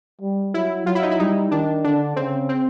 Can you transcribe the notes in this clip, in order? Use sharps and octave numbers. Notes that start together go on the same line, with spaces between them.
G3
F#3 E4
F#3 F4
E4
D#4
E4
G3 D#4
D#3 D4
D3 D4
C#3 C4
C4